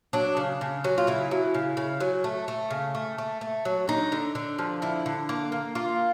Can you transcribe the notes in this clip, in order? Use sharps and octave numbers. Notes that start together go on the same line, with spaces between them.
F#3 D4
C#3
C#3
F#3
F4
C#3 E4
F#3
C#3
C#3
F#3
A3
A3
C#3
A3
A3
A3
F#3
D3 D#4
D3
D3
F3
D3 E4
D3
A#3
A#3
A#3 F4